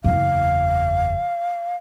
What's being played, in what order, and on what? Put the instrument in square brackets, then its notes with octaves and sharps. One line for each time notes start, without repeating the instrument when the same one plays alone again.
[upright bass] F#1 E2 [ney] F5